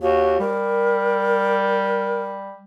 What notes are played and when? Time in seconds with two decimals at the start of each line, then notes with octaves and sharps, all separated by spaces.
0.01 D#2 F#4
0.40 G3 A#4